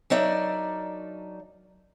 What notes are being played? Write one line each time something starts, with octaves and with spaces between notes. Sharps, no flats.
F#3 D4 D#4 A#4 D5 E5